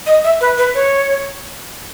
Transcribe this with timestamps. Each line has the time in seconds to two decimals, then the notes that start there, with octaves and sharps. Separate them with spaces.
0.06 D#5
0.24 E5
0.41 B4
0.58 B4
0.74 C#5